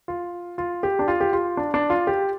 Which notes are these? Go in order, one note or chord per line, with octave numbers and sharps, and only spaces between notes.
F4
F4
G4
D4
F4
G4
F4
D4
D4
F4
G4